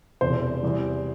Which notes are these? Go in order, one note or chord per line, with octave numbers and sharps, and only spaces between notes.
E1 E2 C3 C5
E2 C3 G3